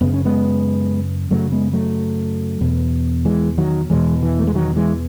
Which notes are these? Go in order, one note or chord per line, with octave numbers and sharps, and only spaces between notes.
F#2 C#3 B3
C#4
G#3 B3
F#2 C#3 F#3 A3
G#3 B3
F#3 A3
E2 B2
E3 G#3
D#3 F#3
E2 B2 E3 G#3
E3
A3
G#3
D#3 F#3
E3 G#3